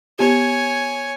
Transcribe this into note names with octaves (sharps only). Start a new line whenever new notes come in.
B3 G4 C#5 G#5